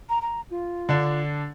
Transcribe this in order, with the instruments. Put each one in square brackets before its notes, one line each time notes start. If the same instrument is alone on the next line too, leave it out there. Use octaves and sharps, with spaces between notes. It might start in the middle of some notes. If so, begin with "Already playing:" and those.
[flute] A#5
A#5
F4
[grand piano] D3 D4